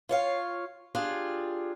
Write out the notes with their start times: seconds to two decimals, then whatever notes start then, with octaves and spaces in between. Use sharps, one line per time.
0.09 F4 C#5 F5
0.95 D4 F4 G4 G#4 D5